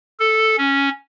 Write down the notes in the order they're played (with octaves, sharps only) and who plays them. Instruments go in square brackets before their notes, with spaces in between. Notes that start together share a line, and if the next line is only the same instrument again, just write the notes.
[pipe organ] A4
C#4